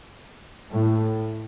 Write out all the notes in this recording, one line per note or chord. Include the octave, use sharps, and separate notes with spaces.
A2